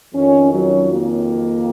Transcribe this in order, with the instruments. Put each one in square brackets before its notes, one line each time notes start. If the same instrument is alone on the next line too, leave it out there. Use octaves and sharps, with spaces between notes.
[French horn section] F2 D#3 C#4
F#3
A#3